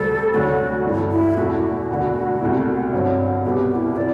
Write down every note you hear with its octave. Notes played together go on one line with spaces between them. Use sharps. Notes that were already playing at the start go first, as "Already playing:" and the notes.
Already playing: D2 C3 G3 C4 A4
D2 D3 F#3 A3 C4 F#4
G2 E3 A3
E4
E2 B2 A3 F#4
E1 D2 D3
C2 B2 A3 E4
G2 D3 F#3 C4
C2 B2 G3 B3 G4 A4
F#4
E4
C3 E3 D5